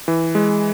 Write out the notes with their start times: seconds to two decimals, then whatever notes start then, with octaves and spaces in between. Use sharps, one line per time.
0.08 E3
0.35 G#3